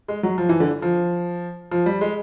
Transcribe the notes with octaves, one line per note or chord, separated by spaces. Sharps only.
G#3
F#3
F3
E3
D3
F3
F3
G3
G#3